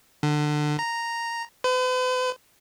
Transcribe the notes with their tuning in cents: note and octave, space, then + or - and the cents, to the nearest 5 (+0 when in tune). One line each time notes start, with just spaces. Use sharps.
D3 +25
A#5 -5
B4 +45